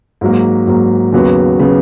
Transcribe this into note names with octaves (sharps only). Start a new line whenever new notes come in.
G#2 F#3 A#3
G#2 F#3 A#3
D#2 C#3 F#3 B3
C#3 F#3 B3